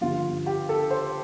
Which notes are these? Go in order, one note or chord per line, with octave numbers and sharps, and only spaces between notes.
G2 D3 F3 F4
G4
A4
C5